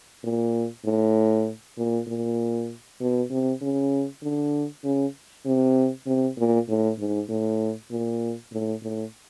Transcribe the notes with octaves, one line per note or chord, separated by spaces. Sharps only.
A#2
A2
A#2
A#2
B2
C3
C#3
D3
C#3
C3
C3
A#2
A2
G#2
A2
A#2
A2
A2